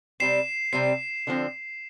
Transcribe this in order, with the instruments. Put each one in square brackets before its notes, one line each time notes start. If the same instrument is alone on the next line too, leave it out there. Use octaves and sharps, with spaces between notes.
[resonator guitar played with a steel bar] C3 G3 C4 [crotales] C7 E7
[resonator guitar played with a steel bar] C3 G3 C4 [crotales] C7
[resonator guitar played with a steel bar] D3 F3 C4